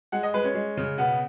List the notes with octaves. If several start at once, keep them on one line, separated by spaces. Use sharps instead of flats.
G#3 F#5
D#5
G#3 B4
C#4
G#3
C#3
B2 B3